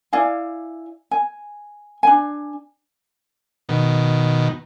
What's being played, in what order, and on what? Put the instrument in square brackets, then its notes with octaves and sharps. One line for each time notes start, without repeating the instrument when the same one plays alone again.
[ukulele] E4 D5 F5 G#5
G#5
D4 G#5
[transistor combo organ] B2 D#3